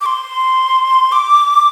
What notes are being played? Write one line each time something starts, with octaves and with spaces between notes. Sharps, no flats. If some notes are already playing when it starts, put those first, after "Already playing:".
D6
C6
D6